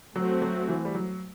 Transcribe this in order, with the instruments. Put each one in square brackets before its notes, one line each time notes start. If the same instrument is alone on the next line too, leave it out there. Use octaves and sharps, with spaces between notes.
[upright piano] F#3 [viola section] A3 C4 F#4
[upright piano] F#3
E3
G3
F#3